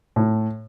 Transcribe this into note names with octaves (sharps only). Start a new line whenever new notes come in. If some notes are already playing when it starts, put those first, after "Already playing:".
A2